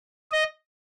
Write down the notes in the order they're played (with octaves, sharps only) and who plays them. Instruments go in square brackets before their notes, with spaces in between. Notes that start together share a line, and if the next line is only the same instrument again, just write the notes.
[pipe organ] D#5